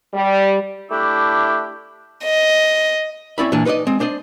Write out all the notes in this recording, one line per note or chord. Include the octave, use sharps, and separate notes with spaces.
G3
A3 D4 E4 G4
D#5
C4 C#4 E4 D5 E5 B5
A#2 E3 D4
D#4 B4 C5 D5 D#5
G#3 C4
D4 C5 D5 D#5